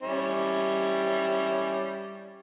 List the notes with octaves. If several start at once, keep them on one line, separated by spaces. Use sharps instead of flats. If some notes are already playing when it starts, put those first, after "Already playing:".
G3 C#4 E4